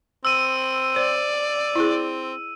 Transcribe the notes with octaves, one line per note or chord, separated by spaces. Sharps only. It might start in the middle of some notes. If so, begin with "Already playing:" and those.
C4 E6 D#7
C5 D5
C4 E4 G#4